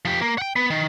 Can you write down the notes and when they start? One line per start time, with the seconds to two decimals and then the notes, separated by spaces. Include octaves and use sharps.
0.05 F3 G4
0.21 A#3
0.38 F#5 G5
0.56 B3
0.70 D#3